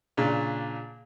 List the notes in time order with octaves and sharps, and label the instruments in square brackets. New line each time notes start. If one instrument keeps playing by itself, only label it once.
[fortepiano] A#2 C#3 D4